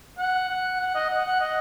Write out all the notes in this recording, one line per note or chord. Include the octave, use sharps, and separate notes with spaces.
F#5
F#5
F#5
D#5
F#5
F#5
D#5